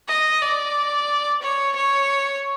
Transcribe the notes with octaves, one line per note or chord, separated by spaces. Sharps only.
D#5
D5
C#5
C#5